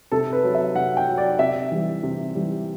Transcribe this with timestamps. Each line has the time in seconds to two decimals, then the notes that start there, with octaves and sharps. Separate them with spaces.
0.12 C3 A4
0.33 B4
0.44 F#3
0.55 E5
0.75 C3 F#5
0.97 G5
1.08 F#3
1.18 D5
1.39 C3 E5
1.71 E3 G3
2.03 C3
2.35 E3 G3